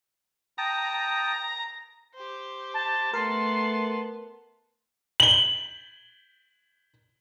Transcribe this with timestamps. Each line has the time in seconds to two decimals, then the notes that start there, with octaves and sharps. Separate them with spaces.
0.58 G5 A5 A#5 D#6
2.14 G4 C5
2.74 A5
3.14 A3 B3 A#4 A5 C6
5.20 F#7 G7